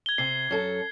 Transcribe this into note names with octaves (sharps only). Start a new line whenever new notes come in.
G#6 G7
C3 C7
F#2 A4